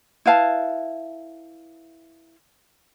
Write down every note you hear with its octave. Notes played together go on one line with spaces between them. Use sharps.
E4 B4 F5 A5